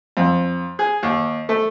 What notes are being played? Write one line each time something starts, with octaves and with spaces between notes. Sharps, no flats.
F2
G#4
D#2
A3